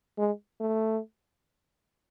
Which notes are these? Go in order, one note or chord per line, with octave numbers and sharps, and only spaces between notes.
G#3
A3